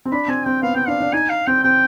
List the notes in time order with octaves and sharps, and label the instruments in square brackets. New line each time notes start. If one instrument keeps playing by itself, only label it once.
[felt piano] C4
[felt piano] D4 [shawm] B5
[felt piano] C4 [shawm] G#5
[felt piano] C4 [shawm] G5
[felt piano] B3 [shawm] F5
[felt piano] C4 [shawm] G5
[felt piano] D4 [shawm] F5
[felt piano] D4
[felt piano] D#4 [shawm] G#5
[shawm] F5
[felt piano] C4 [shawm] G5
[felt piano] C4 [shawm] G5